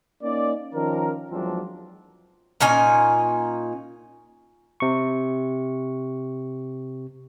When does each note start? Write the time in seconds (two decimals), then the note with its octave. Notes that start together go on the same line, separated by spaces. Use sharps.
0.22 A#3 C#4 D#4 D5
0.75 D#3 F3 C#4 A#4
1.31 E2 F3 F#3 G#3 C4 D4
2.60 A#2 C#4 D#4 G#5
4.80 C3 C#6